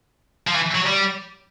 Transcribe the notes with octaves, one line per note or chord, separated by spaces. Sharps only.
F3
E3
F#3
G3